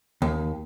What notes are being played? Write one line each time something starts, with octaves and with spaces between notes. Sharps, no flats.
D#2